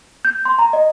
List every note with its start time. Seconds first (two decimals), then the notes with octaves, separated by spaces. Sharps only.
0.25 G6
0.45 C6
0.59 A#5
0.73 D#5